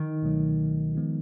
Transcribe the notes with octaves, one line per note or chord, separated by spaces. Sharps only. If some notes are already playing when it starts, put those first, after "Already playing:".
Already playing: D#3
C#2 B2 F#3 A3
F3 G#3 B3 D#4